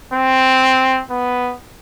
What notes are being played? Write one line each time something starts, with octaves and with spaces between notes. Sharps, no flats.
C4
B3